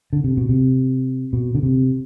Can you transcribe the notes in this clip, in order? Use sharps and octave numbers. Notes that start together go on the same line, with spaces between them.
D3
C3
B2
C3
B2
D3
C3